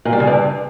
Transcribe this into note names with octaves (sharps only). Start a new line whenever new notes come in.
A#2
G3
C#3
G2